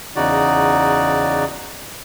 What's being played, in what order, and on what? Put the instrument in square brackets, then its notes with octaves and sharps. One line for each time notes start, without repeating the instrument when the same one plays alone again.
[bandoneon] E2 C#3 D#4 F#4 D5